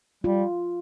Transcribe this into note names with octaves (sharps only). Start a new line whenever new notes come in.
G3 F4